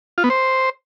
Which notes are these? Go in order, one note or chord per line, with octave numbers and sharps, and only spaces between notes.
F4
B3
C5